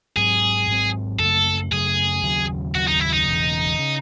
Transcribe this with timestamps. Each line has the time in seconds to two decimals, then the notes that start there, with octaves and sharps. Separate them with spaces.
0.16 G#2 F#3 C4 G#4
0.67 G#2 F#3 C4
1.19 F#2 C#3 F#3 A3 A4
1.72 F#2 C#3 F#3 A3 G#4
2.23 D#2 C#3 F#3
2.75 D#2 C#3 F#3 F#4
2.88 D#4
3.00 E4
3.13 D#4
3.27 E1 E2 C#3
3.79 C#3